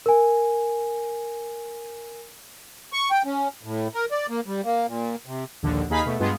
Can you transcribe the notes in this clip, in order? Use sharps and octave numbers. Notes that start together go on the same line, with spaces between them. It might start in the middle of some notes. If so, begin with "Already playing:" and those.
A#4 G#5
C#6
G5
C#4
A2
A#4
D5
A#3
G3
A#3
A#2
C3
A#1 D#2 D3
D#2 D#4 G#4 F5 B5 B6
B2 A3
G2 G#3 B3 F4